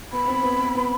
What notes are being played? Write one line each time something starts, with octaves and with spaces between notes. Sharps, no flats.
B3 B5
C4
B3
C4
B3